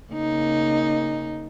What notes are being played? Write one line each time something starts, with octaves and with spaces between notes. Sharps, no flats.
C#3 A#3 D#4